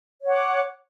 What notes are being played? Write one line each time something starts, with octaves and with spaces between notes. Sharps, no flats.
C#5 F#5 D6